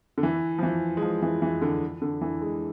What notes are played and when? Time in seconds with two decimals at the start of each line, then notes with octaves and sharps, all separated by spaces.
0.18 D3
0.23 E3
0.59 F3
0.63 E3
0.97 G#3
1.02 F3
1.22 E3
1.42 E3
1.62 D3
2.02 D3
2.21 E3
2.41 G#3